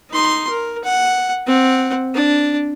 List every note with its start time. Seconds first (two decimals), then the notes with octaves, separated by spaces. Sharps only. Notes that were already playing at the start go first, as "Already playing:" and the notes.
0.11 D#4 C6
0.50 A#4
0.84 F#5
1.47 C4 F#5
2.15 D4